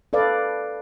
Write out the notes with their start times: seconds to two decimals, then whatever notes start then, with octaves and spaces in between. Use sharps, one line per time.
0.13 A4 B4 D5 F5